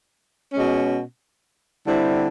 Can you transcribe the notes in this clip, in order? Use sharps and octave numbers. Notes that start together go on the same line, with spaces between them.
B2 G#3 C#4
D3 G3 C4 E4